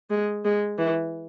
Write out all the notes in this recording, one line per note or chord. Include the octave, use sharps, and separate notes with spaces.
G#3
G#3
E3